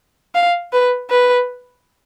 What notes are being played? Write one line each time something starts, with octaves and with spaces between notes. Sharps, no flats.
F5
B4
B4